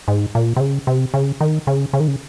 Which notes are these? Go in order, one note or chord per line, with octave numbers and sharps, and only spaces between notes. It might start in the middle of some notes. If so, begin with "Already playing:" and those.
G#2
A#2
C3
C#3
C3
C#3
D#3
C#3
C#3
D#3
C#3